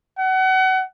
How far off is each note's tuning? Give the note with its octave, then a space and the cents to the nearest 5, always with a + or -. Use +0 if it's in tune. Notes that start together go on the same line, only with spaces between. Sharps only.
F#5 +30